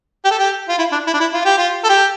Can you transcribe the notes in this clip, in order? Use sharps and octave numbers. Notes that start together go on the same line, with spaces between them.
G4
A4
G4
F4
E4
D4
E4
D4
E4
F4
G4
F4
A4
G4